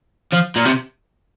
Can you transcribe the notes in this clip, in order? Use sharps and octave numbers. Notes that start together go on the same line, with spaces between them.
F3
A#2
C3